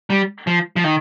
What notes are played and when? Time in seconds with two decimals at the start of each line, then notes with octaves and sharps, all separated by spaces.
0.10 G3
0.47 F3
0.76 F3
0.84 D#3